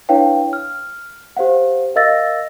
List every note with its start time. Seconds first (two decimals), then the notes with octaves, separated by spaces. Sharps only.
0.09 D4 E4 B4 C#5 F5 G5
0.53 F6
1.37 G4 C5 F5 F#5
1.95 A#4 D#5 F5 E6 A6 A#6